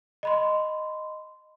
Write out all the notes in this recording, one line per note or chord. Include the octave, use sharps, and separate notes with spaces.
D#5 B5 C6